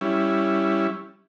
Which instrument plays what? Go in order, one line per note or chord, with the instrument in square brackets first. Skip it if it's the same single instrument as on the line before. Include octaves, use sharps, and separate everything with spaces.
[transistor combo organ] G3 C#4 E4